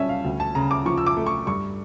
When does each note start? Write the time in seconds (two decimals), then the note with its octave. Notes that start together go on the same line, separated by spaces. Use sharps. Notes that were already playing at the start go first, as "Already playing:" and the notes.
Already playing: G3 C#4 E5 A5
0.09 F5
0.24 D2
0.40 A5
0.55 C#3 A#5
0.71 D6
0.86 F3 C#6
0.98 E6
1.07 D6
1.17 A3
1.26 C#6
1.47 G2 C#6